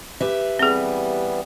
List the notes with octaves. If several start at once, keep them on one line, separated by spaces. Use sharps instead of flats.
G4 B4 E5
E3 G3 B3 C4 G#4